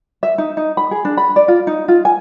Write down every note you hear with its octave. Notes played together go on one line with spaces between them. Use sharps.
E5
D#4
D#4
B5
G#4
D4
B5
D5
F4
D#4
F4
G#5